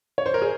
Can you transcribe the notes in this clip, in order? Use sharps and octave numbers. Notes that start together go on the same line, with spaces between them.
C#5
C5
A#4
G#4